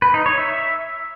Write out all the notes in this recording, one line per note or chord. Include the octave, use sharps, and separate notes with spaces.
B4
D#4
C#5
E5